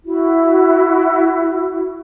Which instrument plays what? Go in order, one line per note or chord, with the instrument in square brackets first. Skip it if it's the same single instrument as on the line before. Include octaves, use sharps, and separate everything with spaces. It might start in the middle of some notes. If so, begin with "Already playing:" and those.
[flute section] E4 F#4